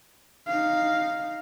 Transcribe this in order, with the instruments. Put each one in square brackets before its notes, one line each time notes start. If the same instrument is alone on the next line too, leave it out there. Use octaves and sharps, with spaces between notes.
[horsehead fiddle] D#4 F5